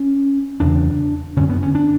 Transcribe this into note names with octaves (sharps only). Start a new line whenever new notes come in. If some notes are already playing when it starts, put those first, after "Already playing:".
Already playing: C#4
E2 C#3 D4
F#2 D3 C#4
B3
C#4
D4